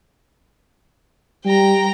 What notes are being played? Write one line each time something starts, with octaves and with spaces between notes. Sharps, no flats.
G3 G5 A#5